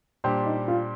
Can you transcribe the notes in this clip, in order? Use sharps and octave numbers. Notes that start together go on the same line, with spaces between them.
A#2 G3 D4 G4 C5
D#4
F4